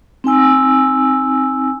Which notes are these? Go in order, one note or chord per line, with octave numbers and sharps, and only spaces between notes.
C4 D#4 G#5 E6